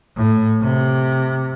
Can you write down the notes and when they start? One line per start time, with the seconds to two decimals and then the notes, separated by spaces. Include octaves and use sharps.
0.17 A2
0.62 C3